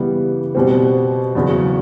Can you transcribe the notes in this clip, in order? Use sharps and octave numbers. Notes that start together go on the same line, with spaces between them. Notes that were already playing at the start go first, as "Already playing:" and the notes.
Already playing: C#3 E3 G3 B3
B2 G3 C4
E2 C#3 F#3